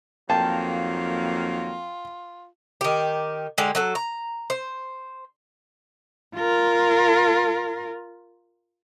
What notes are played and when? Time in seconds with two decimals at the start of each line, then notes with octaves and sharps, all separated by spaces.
0.30 F2 D#3 F#3 A#3 F4 G5 A5
2.81 D#3 G4
3.58 D3 G#3 G4
3.75 F#3 F#4 A4
3.95 A#5
4.50 C5
6.36 F4 A#4